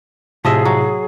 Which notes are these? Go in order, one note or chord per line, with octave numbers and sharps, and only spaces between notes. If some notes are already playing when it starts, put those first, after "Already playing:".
A2 C3 F3 G#4 D#5 E5
F#3